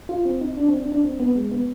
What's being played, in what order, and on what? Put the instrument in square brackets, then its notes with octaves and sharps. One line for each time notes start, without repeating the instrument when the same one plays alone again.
[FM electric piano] F4
C4
D#4
D4
C4
D4
D4
C4
B3
G#3
B3